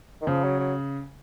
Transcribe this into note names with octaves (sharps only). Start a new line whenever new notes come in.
D#3
C#3 F3
F#3
F#3